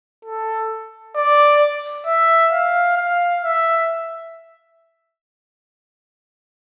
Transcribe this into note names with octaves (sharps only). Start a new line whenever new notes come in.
A4
D5
E5
F5
F5
E5